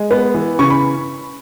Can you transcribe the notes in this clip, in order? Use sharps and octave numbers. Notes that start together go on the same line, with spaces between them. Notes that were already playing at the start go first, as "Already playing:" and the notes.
Already playing: G#3
B3
E3
C#3 C#6
B5